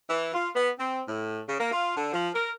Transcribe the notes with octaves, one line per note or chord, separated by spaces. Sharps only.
E3
F4
B3
C4
A2
C#3
A#3
F4
D3
F3
A#4